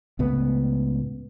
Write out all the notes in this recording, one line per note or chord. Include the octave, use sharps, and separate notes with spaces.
C#2 A2 B3